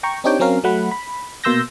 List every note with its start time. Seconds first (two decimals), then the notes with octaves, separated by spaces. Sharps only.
0.03 G5 A#5 C#6
0.24 C4 D4 D#4 G4 C#5 G5
0.39 F#3 C4 C#4 A#4 F5
0.64 F#3 A3 F#5 B5
0.91 B5
1.44 B2 A#3 C6 E6 G6 A#6